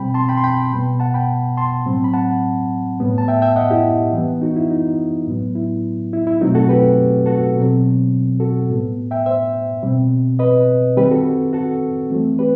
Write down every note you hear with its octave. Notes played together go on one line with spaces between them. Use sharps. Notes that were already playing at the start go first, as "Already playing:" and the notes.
Already playing: B2 G3 C4 G5 B5
A5 C6
G5 B5
C6
G5 B5
B2 G3 B3
F#5 A5
G5 B5
A5 C6
A2 F#3 C4
B5
F#5 A5
A2 G3 B3
A5
E5 G5
E5 G5
D#5 F#5
E4 G4
E3 B3
D#4 F#4
E4
D#4
A2 F#3 B3
E4
E4
E4
B2 F#3 A3 C4 D#4 F#4
F#4 A4
G4 B4
F#4 A4
B2 F#3 C4
F#4 A4
A2 G3 B3
E5 G5
C5 E5
B2 G3 C4
B4 D#5
D#3 G3 C4 G4 B4
F#4 A4
F#4 A4
E3 A3 C4
G4 B4